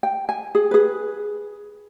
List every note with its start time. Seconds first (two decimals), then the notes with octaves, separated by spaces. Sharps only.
0.03 G5
0.29 G#5
0.55 G#4
0.71 G#4 B4